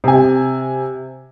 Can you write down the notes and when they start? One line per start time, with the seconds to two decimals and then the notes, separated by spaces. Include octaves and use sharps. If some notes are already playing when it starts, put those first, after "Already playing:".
0.04 C3 G#5